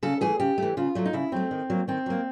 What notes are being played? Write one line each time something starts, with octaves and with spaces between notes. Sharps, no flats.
C#3 A4
E3 A3 G#4
C#3 G4
E3 A3
C#3 F4
F#3 A3
D#4
C#3 E4
F#3 A3 C4
D#3
F#3 A#3
D#3 C4
F#3 A#3